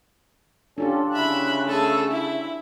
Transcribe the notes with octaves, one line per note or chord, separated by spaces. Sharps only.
C#4 D4 F4 G4 A4
C#3 E4 E5 B5 F#6
A3 G#4 A4 E6
E4 E5